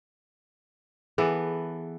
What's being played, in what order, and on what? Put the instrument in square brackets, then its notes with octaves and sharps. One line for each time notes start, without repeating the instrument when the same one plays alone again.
[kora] E3 B3 A4 [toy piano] G#4